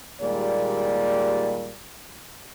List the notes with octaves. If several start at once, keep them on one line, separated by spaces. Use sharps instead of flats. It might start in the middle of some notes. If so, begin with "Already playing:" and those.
D#2 A#2 G3 G#3 D5